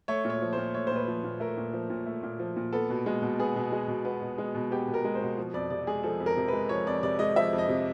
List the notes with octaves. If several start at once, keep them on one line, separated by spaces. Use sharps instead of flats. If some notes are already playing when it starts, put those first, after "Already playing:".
A3 C#5
A#2 C#5
F3
A#2 C5
A3 C#5
C5
A#2 B4
F3
A#2
A3 A#4
A#2
F3
A#2
A3
A#2
F3
A#2
B3 A4
B2
G#3
B2
B3 G#4
B2
G#3
B2
B3
B2
G#3
B2
B3 G4
B2
A#4
G#3
C5
B2
F3
F2 D5
C3 D5
G#3 G#4
F3 A4
F2
A#4
C3
G#3 B4
F3 C#5
F2 D5
C3 D5
G#3 D#5
F3 E5
F2
D#5
C3